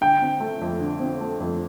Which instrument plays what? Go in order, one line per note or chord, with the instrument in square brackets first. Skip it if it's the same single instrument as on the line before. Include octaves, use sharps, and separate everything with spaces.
[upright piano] D3 G5
C4
A3
F2
D3
C4
A3
F2